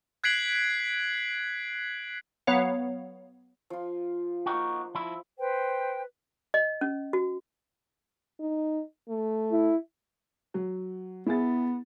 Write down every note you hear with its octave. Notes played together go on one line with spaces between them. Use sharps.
F#6 G#6 B6 C7 D7 F#7
F#3 B3 C#5 F5
F3 F4
A#3 D#4 F#4
F3 E4
B4 C5 G5
D#5
C#4
F#4
D#4
A3
E4
F#3
B3 E4 G#4 A6